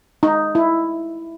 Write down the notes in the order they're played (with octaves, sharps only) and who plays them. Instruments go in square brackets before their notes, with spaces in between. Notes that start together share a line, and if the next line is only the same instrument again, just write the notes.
[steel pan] D#4
E4